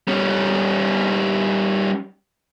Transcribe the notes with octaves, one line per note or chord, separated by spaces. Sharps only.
G3 C#4